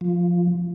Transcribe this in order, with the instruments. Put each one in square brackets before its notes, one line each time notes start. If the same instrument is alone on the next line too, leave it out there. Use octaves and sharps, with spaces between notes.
[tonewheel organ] F3